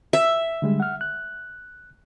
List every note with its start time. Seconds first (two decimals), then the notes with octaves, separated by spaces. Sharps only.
0.13 E5
0.62 D3 G3 G#3
0.80 F#5 F6
1.01 F#6